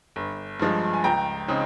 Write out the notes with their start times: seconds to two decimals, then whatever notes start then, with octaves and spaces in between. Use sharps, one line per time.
0.16 G1
0.60 G2 F3 G#3
0.94 G#5
1.04 C#2 G5 A#5
1.48 C#3 G#3 C4 D#4